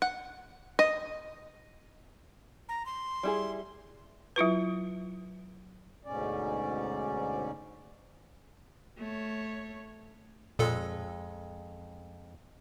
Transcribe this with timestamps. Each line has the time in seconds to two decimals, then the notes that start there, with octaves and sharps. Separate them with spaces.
0.02 F#5
0.79 D#5
2.69 A#5
2.86 C6
3.23 G3 E4 G#4
4.36 F#3 E4 F4 B4
6.05 D2 G#2 B2 C#4 D5
8.98 A3 C#5
10.59 F2 A#2 G#3 A4